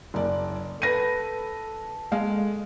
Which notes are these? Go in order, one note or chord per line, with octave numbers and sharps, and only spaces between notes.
F#1 D5
A4 B4 A#6 D#7
G#3 F5